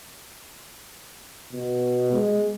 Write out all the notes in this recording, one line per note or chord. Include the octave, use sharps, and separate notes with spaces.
B2
G#3